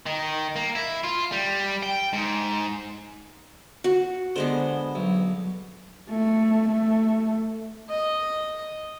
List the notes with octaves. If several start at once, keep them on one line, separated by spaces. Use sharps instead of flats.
D#3
A#3
E4
F4
G3
G5
G#2
F#4
D3 G#3 B3 C5
B1
A3
A3
D#5